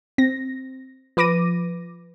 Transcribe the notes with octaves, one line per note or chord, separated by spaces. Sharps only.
C4 A#6
F3 B4 D6 A#6 D#7